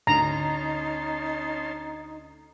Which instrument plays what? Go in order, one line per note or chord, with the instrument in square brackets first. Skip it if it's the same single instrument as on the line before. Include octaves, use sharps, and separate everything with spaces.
[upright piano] D2 [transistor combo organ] C#4 A5 C6 [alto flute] D#4 [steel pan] A#5